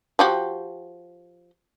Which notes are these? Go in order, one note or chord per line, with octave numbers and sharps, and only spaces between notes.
F3 F#4 G4